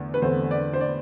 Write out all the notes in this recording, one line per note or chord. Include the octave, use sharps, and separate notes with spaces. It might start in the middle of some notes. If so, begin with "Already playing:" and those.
Already playing: E2 D3 A3
B4
E2 D3 A3 C4 C5
D5
C5
D5